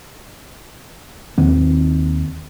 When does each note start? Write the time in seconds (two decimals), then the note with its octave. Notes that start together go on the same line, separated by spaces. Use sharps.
1.38 D#2 D#3 C4